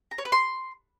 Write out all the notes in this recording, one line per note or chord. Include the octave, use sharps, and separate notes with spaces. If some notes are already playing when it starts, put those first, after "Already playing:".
A#5
C#5
B4
C6